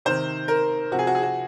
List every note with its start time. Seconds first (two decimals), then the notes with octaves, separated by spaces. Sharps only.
0.05 C3 D#3 C5
0.48 A#4
0.91 C3 F3 F#4
0.99 G#4
1.07 F#4
1.15 G#4
1.23 F#4